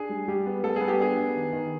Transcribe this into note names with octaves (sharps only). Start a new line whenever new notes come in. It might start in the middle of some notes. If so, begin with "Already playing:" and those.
Already playing: D4 G#4
G3
G3 G4
B3
G3 A4
B3 G#4
G4
D4 G#4
B3
D#3
D#3